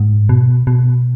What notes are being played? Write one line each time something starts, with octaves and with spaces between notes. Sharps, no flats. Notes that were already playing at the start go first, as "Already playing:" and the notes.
Already playing: G#2
B2
B2